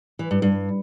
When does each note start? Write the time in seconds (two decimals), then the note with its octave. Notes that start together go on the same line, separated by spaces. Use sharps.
0.19 E3
0.31 G2
0.42 G2